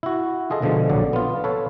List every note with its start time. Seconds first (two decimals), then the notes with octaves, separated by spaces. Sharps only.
0.03 E4 F#4
0.50 F4 G#4 A4 D#5
0.62 B2 D3 F3 G#3
0.89 A#1 D3 F#3 D5
1.13 B3 F4
1.44 A4 B4 C#5 F5